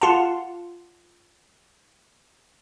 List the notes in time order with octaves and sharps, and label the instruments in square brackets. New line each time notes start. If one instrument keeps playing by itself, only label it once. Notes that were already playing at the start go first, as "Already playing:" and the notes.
[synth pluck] F4 F5 F#5 A5